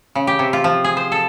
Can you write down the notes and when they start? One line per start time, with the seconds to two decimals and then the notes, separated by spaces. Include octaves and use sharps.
0.15 C#3
0.27 G4
0.39 C3
0.53 F4
0.64 F3
0.84 G#4
0.97 C5
1.12 A4